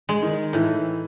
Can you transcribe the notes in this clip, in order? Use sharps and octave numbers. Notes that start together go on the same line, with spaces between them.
G#3
D#3
A2 E3